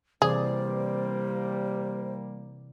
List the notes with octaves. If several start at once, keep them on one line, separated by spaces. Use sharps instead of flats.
C3 E3 G3 A#3 G#4 C5 D5